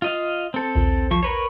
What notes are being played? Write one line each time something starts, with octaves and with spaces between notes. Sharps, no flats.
F4 D#5 F5
C4 A4
A#1 D#2
F3 C#6
A#4 B4 C#5